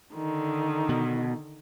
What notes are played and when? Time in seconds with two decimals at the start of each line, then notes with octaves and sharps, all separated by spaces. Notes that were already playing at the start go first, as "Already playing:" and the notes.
0.13 D3 D#3
0.89 B2